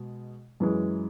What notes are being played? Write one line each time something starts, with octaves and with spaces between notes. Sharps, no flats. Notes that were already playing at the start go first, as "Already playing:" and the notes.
Already playing: B2 G#3
F#2 E3 G#3